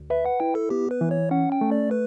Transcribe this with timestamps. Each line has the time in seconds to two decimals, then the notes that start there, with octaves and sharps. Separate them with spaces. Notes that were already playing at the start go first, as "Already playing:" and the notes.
Already playing: D2
0.10 B4 E5
0.26 F#5
0.40 E4 G5
0.55 A4
0.70 B3 G4
0.91 B4
1.01 E3
1.11 C#5
1.31 C#4 F#5
1.52 G5
1.61 A3
1.72 D5
1.91 B4